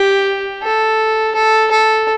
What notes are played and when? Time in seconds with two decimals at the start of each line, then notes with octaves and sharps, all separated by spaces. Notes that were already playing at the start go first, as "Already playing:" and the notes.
Already playing: G4
0.63 A4
1.35 A4
1.71 A4